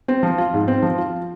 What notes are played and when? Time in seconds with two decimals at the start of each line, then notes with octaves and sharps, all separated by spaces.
0.08 C4
0.23 F3
0.38 F4
0.54 G#2
0.68 C4
0.82 F3
0.98 F4